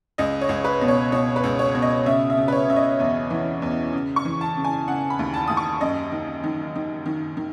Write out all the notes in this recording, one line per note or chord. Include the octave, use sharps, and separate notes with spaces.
C#2 D#5
C#5
C#2
B4
B2
C#5
B2 C#5
B4
C#2
C#5
B2
D#5
C#3 E5
E5
C#3
B4
C#5
C#3 E5
D#5
E2
E3
E2
C#3
C#6
E3
A5
C#3
G#5
C#3 F#5
B5
D#2
A5
D#2 D#6
C#6
F#2 D#5
D#3
D#3
D#3
D#3
D#3